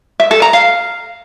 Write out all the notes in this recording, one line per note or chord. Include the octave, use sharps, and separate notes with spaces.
E5
A4
A#5
F5